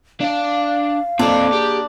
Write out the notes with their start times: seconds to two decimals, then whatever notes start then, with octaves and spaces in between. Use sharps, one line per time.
0.20 D4 D5 F5
1.19 A#2 C4 D4 A4
1.52 G4 G#4